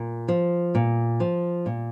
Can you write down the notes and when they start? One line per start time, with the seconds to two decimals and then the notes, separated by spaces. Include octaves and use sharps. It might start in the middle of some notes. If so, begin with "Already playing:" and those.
Already playing: A#2
0.28 F3
0.75 A#2
1.20 F3
1.66 A#2